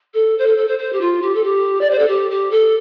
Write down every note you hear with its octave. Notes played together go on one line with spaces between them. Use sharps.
A4
C5
A4
A4
C5
C5
G4
F4
G4
A4
G4
D5
C5
A4
G4
G4
A4